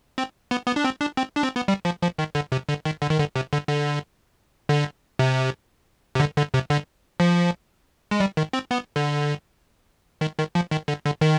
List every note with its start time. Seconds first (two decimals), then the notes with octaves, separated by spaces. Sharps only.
0.18 C4
0.51 B3
0.67 B3
0.76 D4
0.84 C4
1.01 D4
1.17 C4
1.36 D4
1.43 C4
1.56 B3
1.68 G3
1.85 F3
2.02 F3
2.19 D#3
2.35 D3
2.52 C3
2.69 D3
2.85 D#3
3.02 D3
3.10 D#3
3.19 D3
3.36 C3
3.53 D3
3.68 D3
4.69 D3
5.19 C3
6.15 C3
6.20 D3
6.37 D3
6.54 C3
6.70 D3
7.20 F3
8.11 G#3
8.20 G3
8.37 D#3
8.53 C4
8.71 B3
8.96 D3
10.21 D#3
10.38 D#3
10.55 F3
10.71 D#3
10.88 D3
11.05 D3
11.21 D#3